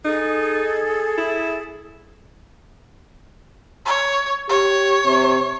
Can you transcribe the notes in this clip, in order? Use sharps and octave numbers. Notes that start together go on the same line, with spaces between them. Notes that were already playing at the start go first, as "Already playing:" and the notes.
D#4 G#4 A4
E4
C#5
G4 C#5
C3